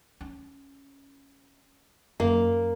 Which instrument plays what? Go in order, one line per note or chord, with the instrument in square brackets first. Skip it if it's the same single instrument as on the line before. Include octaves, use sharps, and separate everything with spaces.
[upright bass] C#4
[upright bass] F#2 [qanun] A#3